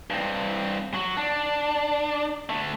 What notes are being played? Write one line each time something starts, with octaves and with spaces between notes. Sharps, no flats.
G2 C4
F#3 F#4
D4
D3 A3